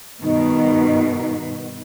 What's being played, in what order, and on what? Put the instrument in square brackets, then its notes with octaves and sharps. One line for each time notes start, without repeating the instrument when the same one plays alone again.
[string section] G2 B2 D#3 [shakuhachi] D#4